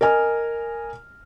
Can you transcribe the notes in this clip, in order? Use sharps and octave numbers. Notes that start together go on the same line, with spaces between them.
A#4 D#5 G#5 F6